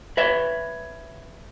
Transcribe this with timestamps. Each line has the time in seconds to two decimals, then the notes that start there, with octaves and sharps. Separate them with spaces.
0.17 B4 C#5 E5